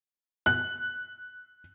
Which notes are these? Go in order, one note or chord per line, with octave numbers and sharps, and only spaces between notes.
F#6